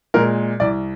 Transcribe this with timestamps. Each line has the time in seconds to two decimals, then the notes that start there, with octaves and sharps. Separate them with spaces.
0.14 A#2 G#3 A#4
0.60 C2 D5